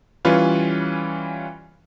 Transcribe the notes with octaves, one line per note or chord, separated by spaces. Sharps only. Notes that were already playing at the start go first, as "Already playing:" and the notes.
E3 G3 C#4 F4 B4 C#5